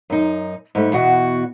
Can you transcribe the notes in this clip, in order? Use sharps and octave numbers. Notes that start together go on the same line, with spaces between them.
F#2 D#4
G#2 G3 A3
E2 B2 F#4